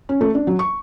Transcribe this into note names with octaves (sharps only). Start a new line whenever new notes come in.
C#4
A3
D4
F#3
C#6